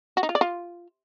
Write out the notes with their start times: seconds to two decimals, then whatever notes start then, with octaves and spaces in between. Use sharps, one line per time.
0.17 F#4
0.23 D#4
0.29 F4
0.35 D5
0.41 F4